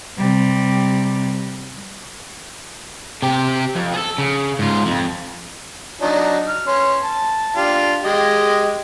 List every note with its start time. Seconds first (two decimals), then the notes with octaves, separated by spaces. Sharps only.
0.17 C3 G3
3.22 C3 G4
3.75 F2
3.94 G#4 A4
4.18 C#3
4.59 G#2 F4
4.86 F2
6.02 F#3 D4 D#4
6.48 F6
6.67 C#4 C6
7.03 A5
7.56 D4 F4 G4
8.04 G#3 G4 D#5